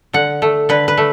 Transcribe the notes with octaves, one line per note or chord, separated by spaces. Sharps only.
D3 F#5
A3
D3 B4
B4
A3